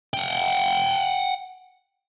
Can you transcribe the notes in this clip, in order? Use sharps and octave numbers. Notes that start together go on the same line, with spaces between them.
F#5 G5